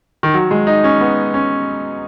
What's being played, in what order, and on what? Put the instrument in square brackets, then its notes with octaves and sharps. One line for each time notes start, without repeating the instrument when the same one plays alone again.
[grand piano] D#3
F#3
G#3
D#4
C#4
B3
C#4